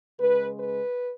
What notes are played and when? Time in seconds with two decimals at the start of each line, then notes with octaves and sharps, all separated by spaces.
0.19 C#3 G#3 B4
0.58 B4